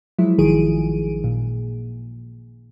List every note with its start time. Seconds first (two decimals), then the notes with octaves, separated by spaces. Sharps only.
0.19 F3 F#3 G#3 E4
0.38 A1 D#3 F3 G#4 D7 D#7
1.24 A#2